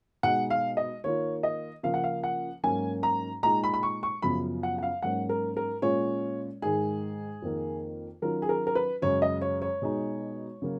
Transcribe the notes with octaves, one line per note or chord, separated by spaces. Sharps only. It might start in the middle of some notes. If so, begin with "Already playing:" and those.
B2 G#3 D#4 F#5
F5
D#5
D#3 A#3 F4 C#5
D#5
C#3 F3 A#3 F4 F5
F#5
F5
F#5
G#2 F#3 A#3 C#4 G#5
A#5
A#2 G#3 D#4 A#5
B5
B5
C#6
C#6
F#2 C#3 F3 B3 B5
F#5
F#5
F5
G#2 F#3 A#3 C#4 F#5
A#4
A#4
A#2 G#3 C#4 F4 C#5
G#2 D#3 G#3 G#4
F2 D#3 A#3
D#3 F#3 C#4 F4 A#4
G#4
A#4
A#4
B4
F#2 C#3 G#3 C#5
D#5
C#5
C#5
B2 G#3 D#4
C#3 F#3 A#3